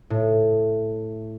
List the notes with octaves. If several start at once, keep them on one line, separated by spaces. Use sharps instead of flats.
A2